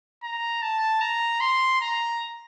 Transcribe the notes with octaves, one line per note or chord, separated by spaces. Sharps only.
A#5
A5
A#5
C6
A#5